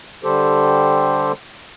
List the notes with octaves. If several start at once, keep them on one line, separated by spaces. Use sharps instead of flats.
D3 G3 G4 A4 C5